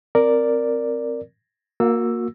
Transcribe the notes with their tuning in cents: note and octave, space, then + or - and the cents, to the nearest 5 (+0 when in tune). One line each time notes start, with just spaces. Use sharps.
C4 +0 A#4 +0 D5 +0
A#3 +0 F#4 -35 E6 +5